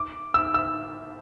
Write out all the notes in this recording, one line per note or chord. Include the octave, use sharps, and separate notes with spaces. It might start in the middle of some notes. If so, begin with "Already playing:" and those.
Already playing: D6
E6
E6